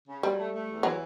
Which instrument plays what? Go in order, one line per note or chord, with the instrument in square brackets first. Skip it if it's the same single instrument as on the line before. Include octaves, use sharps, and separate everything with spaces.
[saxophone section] C#3
[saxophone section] F#3 [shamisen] G3
[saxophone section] A3
A3
E2
[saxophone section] E3 [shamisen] F#3